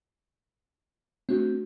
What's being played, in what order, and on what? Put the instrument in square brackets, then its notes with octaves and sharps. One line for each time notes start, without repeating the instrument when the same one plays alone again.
[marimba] A3 D4 F#4 [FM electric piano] C4